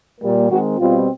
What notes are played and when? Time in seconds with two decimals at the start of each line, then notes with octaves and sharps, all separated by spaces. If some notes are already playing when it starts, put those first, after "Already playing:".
0.20 A#2 G3 A#3
0.50 D#3 G#3 C4 F#4
0.79 B2 G3 C4 F4